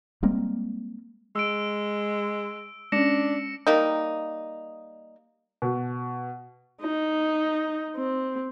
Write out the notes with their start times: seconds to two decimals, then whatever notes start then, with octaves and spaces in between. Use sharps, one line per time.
0.23 G3 G#3 A#3 C4
1.36 G#3 E6 D7
2.92 G#3 C#4 D4 A#6 C#7 E7
3.67 G3 A#3 D#4
5.62 B2
6.81 D#4
7.96 C4